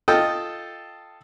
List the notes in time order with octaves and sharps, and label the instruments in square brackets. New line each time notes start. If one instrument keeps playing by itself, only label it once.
[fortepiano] F4 A4 D#5 G5